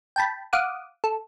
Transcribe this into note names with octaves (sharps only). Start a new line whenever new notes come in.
G5 A5 B5
F5 F#5 D6 D#6
A4